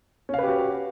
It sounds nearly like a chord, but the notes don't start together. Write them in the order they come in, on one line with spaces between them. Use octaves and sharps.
C#4 F5 B4 G4 F#4